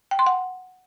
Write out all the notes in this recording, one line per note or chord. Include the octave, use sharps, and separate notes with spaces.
G5
C6
F#5